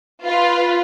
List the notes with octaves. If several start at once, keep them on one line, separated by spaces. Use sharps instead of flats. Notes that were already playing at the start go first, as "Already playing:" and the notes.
F4 B4